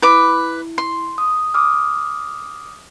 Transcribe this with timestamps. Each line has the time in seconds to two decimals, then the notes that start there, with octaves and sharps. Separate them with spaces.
0.02 E4 B4 D6
0.78 C6
1.18 D#6
1.54 D6 D#6 F6